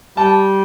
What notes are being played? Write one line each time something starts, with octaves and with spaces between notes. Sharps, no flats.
G3 A5